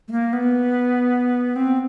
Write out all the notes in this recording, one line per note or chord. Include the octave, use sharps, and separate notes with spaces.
A3
A#3
B3
C4